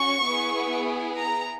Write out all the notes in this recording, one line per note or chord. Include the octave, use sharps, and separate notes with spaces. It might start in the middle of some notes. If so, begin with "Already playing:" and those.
Already playing: C#4 F#4 C#6
B3 E4 G#4
A#5